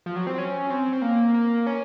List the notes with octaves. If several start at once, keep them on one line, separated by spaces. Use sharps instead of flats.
F3
F#3
C4
C#4
C4
C4
A#3
A#3
C#4